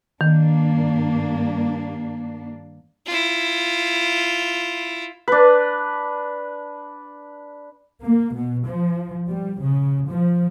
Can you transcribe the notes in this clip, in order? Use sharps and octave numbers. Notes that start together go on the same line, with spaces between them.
G2 D#3 A#3 D4
E4 F4
D4 B4
A#3
B2
F3
G3
C#3
F3